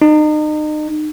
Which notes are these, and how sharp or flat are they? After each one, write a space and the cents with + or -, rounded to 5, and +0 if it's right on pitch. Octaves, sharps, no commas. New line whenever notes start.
D#4 -35